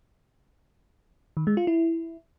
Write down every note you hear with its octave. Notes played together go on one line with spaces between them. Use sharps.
D#3
G#3
F4
E4